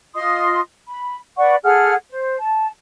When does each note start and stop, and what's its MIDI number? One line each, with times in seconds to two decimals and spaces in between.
0.15 0.60 65
0.15 0.60 75
0.15 0.60 84
0.15 0.60 87
0.87 1.17 83
1.37 1.56 71
1.37 1.56 74
1.37 1.56 78
1.37 1.56 85
1.64 1.94 68
1.64 1.94 69
1.64 1.94 78
1.64 1.94 89
2.10 2.37 72
2.39 2.69 81